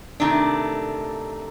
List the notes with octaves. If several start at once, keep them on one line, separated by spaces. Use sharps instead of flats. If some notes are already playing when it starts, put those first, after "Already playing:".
C3 D#3 A3 D4